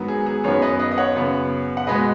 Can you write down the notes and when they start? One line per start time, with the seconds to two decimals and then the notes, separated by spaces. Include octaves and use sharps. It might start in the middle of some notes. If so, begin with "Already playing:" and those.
Already playing: G#2 D#3 F#3 B3
0.08 G#4
0.26 G#4
0.44 F#2 D#3 B3 G#4 C#5
0.62 B4 D#5
0.79 B4 D#5
0.92 D#5
0.98 C#5 F#5
1.16 F#2 C#3 B3
1.77 F#5
1.87 B2 G#3 B3 B4 D#5